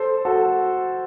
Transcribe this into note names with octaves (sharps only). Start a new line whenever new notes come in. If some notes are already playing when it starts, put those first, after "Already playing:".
Already playing: A4 C5
F#4 A4